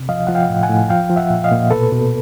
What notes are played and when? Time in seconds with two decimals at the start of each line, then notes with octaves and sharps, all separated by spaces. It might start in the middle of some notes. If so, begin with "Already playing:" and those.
Already playing: C3
0.09 F3 D#5 F5
0.27 F3 F#5
0.35 F5 G5
0.49 A2
0.63 F#5 G#5
0.69 A2
0.89 F3 F5 G5
1.10 F3
1.16 E5 F#5
1.30 A#2
1.44 D#5 F5
1.51 A#2
1.71 B2 A4 B4
1.92 B2